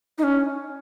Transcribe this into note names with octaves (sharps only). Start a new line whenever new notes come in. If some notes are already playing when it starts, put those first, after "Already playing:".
D#4
C#4